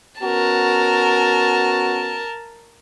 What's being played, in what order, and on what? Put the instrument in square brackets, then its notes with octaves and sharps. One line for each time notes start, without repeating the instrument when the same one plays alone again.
[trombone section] B3 C#4 F#4 [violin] A#4 A5